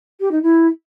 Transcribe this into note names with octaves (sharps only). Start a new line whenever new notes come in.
G4
D#4
E4